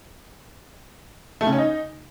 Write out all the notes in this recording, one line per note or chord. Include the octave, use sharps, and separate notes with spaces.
A3
C#3
C#4
D#4